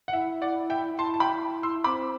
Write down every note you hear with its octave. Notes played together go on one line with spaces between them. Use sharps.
F#5
E4 E5
D5 F#5
E5 G5
E4 A5 C6
A5
G5 B5
C6 E6
C4 B5 D6